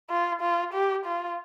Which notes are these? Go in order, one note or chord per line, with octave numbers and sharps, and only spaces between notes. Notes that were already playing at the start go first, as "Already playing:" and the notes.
F4
F4
G4
F4